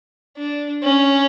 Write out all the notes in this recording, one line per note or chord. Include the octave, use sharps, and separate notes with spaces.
D4
C#4